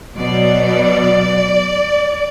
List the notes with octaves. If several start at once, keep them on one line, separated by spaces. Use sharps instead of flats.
B2 F#3 B3 D5